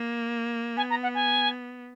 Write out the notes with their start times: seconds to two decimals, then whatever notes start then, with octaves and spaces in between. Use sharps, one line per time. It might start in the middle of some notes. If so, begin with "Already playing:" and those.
Already playing: A#3
0.77 B3 G#5
0.90 A#5
1.03 F#5
1.14 G#5